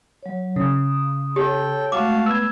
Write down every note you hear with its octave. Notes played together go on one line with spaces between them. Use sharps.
F#3 C#5
C#3 D#6
G4 A4 C#5 G5
G#3 A3 F#4 F5 A5 D6
B3 E6 G#6